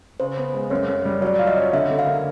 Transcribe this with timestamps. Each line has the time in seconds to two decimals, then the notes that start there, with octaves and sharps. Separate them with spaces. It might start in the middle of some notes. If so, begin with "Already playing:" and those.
0.20 C#3 C5
0.37 B3
0.54 G#3
0.70 F#2 C#5
0.87 F#2
1.05 G3
1.22 F#3 D5
1.39 F4
1.47 D#5
1.56 C#4
1.73 D3 E5
1.91 D3
1.99 F5
2.07 A#3